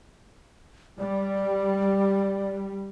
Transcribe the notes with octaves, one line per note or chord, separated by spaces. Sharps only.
G3 D5